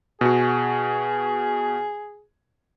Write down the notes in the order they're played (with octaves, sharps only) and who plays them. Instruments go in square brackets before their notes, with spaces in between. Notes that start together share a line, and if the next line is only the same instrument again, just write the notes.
[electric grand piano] B2 F#4 [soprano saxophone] G#4